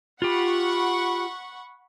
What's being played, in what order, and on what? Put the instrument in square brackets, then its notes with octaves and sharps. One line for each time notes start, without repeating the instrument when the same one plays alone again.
[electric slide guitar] F4 G4 [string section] F#5 B5 C#6